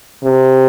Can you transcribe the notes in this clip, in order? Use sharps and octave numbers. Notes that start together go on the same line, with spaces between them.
C3